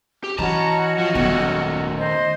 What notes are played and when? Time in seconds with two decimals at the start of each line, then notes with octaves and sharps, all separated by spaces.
0.24 G4
0.39 E3 C#4 F#4 D#5 A5 A#5
0.99 F3
1.15 D#1 D#3 A3 B3
1.98 C5 D#5